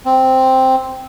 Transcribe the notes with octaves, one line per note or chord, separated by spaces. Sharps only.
C4